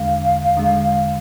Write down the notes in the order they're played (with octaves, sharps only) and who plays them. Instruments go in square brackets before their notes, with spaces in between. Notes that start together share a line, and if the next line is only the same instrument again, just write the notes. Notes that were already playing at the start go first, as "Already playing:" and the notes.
Already playing: [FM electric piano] E2 D3 G#3 [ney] F5
[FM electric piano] E2 D3 G#3